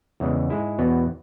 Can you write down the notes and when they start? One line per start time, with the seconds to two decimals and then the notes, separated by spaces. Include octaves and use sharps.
0.20 E2 C#3 E3 G#3
0.50 G#2 G#3 E4 G#4
0.78 E2 B2 B3 F#4